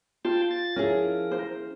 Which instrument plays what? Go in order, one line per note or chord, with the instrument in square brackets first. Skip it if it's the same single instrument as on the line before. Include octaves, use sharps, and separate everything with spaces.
[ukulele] F4 [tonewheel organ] C5 G5 A5
[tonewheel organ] A6
[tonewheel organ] F3 A#4 [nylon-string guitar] C#4 E4 G#4
[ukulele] C5